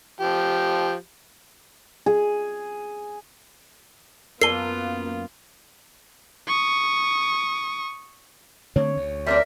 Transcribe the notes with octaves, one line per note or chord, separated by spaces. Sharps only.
F3 G4
G#4
F#2 A#3 B3 F4 A#4 A5 C7 G7
C#6 D#6
D3 A3 C4 C#5
D2
G3 C4 D4 A#4 E5